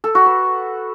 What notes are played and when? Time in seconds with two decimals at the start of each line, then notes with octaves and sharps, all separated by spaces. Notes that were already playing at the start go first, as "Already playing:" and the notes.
0.04 A4
0.15 F#4
0.26 B4